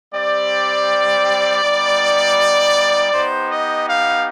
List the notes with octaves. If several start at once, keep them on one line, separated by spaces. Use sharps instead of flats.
G3 C4 G4 D5
G3 B3 D#4
B3 D#4 G4 C5
D#5
F5